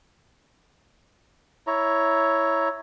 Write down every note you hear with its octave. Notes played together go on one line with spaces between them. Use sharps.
E4 C#5 A#5